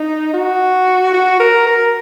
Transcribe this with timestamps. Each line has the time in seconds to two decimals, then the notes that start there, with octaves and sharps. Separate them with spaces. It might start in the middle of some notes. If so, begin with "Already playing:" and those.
Already playing: D#4
0.33 F#4
1.13 F#4
1.39 A#4
1.66 A#4